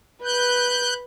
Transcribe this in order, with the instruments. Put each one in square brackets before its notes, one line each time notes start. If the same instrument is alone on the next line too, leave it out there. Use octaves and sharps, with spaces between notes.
[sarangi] B4 [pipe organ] F#6 G6